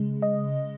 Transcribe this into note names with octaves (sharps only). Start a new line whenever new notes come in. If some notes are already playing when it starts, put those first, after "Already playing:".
Already playing: C#3 G#3
D#5